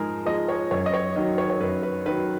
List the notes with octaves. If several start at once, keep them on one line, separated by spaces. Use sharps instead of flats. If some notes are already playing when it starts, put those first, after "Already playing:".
Already playing: G#2 F3 G#3 G#4 A#4
F3 G#3 D#5
C#5
F#2 C#5
D#5
C#5
D#3 F#3 D#5
C#5
C#5
F#2 B4
B4
D#3 F#3 B4